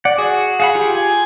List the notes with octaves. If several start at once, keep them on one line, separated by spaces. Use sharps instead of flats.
D5 F#5
F#4 G#4
G#4 F5 F#5 B5
F4 G4
G#5